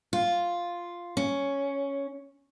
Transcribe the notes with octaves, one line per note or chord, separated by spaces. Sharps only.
F4
C#4